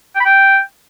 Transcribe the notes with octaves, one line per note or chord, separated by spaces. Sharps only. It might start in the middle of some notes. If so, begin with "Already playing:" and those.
G5
B5
G5